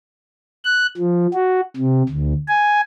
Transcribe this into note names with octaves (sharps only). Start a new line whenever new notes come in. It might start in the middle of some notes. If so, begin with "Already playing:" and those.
F#6
F3
F#4
C3
D2
G#5